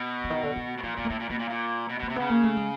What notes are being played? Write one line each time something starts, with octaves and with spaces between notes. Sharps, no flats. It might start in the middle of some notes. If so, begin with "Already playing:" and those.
Already playing: B2
D3
D#3
D3
D#3
B2
A#2 F3
A#2 B3
A3
A2 A#3
A#2
B2 A#3
A#2
A#2
B2
B2 A#3
C3
C#3 B3
A#3
A3
G#3